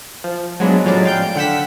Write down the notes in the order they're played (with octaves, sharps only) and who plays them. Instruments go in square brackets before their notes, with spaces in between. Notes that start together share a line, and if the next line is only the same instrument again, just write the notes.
[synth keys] F3
F#3 G#3 B3 D4
A2 F3 F#3 G#3 C#4 D5
F5 G5 G6
D3 F#5 G5 E6 B6